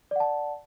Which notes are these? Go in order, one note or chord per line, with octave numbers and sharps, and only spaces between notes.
D5 F#5 A5